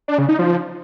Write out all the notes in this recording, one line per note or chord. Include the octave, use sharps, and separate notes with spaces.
D4
C#3
D#4
F3